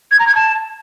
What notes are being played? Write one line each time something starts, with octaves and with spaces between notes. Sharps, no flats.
G#6
A#5
G#6
A5